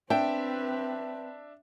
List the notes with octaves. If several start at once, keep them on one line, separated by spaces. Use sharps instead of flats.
C4 D4 B4 E5 G5